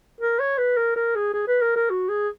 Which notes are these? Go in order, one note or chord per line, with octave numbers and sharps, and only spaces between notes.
A#4
C#5
B4
A#4
A#4
G#4
G#4
B4
A#4
A#4
F#4
G#4